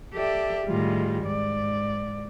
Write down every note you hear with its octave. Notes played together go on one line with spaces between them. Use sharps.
G4 A4 D5 E5
A2 D#3 G3 G#3 F4
G#2 D5